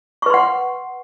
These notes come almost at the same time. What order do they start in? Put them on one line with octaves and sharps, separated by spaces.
C#6 B4 C6 F#5